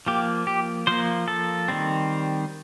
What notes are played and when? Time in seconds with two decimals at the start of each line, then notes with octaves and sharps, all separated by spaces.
0.07 F3 A#3 G4
0.47 G4
0.87 F3 A#3 C5
1.28 A4
1.68 D#3 G3 C4